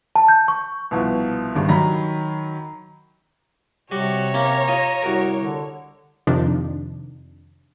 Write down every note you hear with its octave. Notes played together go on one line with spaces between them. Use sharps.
A5
G6
C#6
C2 B2 F3
G#1 G2
D#3 F#3 A#5 B5
C3 G3 F#4 C#5
A#3 C4 C#4 A#5
F4 D#5
C2 F#4 A#4
D3
F2 C3 D#3 F3 D4 D#4